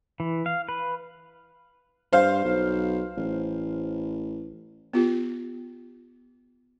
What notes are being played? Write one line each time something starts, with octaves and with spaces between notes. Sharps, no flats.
E3
F5
B4
G2 C5 F5
B1
A1
B3 F4 G4